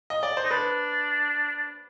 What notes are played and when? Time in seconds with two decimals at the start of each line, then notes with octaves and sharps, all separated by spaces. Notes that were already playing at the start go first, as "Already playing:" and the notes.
0.10 D#5
0.23 D5
0.37 C5
0.44 D#4
0.51 D4 B4